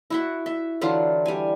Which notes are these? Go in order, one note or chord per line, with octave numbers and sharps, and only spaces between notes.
E4 F#4 E5
E5
D3 E3 F#3 F4
G3 G#5